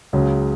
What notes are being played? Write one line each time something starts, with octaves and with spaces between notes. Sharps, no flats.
C#2 C#3 F#3